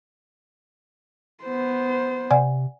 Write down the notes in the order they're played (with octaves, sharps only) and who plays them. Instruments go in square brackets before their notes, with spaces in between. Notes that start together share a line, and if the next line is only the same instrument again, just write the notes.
[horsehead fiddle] B3 C5
[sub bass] C3 [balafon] D5 F#5 G#5